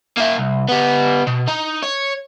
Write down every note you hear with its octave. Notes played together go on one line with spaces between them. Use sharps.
A#3 E5
C2
B3 G4
B2
D#4
C#5